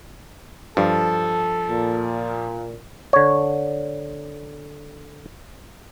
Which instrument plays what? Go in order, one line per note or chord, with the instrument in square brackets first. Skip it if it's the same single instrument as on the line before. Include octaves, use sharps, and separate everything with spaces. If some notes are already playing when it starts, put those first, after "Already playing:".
[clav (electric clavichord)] G2 [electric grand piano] F3 [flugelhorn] A4
[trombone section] A#2
[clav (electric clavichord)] D3 C#5